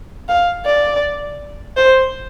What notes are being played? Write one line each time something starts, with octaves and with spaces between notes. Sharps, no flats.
F5
D5
C5